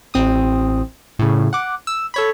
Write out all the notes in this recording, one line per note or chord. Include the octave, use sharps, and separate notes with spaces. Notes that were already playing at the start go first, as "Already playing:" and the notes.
A1 C4 D#6
A2 C#3
F#5 D6
E6
A4 C#5 B5